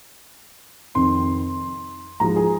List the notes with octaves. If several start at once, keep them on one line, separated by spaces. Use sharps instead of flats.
F2 C3 D#3 C4 C6
G#2 F3 G#3 F4 A#5
G#4